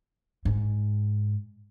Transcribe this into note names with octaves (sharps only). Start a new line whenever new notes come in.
G#2